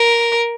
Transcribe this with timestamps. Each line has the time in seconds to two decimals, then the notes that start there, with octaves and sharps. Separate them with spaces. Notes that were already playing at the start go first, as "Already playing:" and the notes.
Already playing: A#4